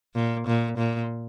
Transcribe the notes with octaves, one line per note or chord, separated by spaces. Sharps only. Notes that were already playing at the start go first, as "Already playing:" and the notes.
A#2
A#2
A#2